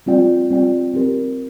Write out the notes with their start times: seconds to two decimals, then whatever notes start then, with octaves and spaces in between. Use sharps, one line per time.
0.06 G3 C4 F4 D5 G5
0.50 G3 C4 F4 D5 G5
0.94 C4 G4 A#4